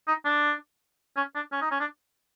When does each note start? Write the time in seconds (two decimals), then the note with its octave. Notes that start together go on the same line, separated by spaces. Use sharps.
0.07 D#4
0.25 D4
1.16 C#4
1.35 D4
1.52 C#4
1.61 D#4
1.71 C#4
1.80 D4